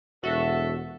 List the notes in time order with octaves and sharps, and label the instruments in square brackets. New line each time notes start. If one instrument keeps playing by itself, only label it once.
[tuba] E1 [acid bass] F#4 [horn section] A4 E5